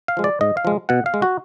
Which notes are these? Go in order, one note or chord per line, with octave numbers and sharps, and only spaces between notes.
F5
F3 G#3
D5
G#2 D#5
F5
F3 G#3
B2 F#5
F5
G#3
F#4